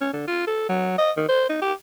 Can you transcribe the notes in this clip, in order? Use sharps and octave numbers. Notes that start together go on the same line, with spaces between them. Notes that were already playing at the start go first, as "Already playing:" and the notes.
C#4
D3
F4
A4
F#3
D#5
D#3
C5
D#4
G4